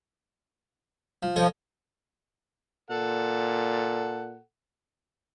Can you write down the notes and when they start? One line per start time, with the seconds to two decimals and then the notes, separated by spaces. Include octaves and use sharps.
1.23 F3
1.36 F3 A4 C#5 D#5
2.90 A#2 A4 F#5